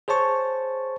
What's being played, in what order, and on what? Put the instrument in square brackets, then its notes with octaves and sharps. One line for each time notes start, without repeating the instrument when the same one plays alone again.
[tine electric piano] G#4 C5 C#5 A5 C#6